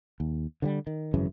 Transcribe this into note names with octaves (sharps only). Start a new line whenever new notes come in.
D#2
D3 F3 G3
D#3
G#1 F#2 C#3 E3